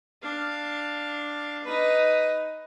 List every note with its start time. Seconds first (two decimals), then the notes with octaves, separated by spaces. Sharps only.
0.22 D4 F5
1.64 D#4 B4